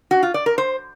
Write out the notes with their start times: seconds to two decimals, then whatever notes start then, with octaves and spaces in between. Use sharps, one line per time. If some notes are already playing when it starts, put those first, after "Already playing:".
0.11 F#4
0.23 F4
0.34 D5
0.46 A#4
0.58 C5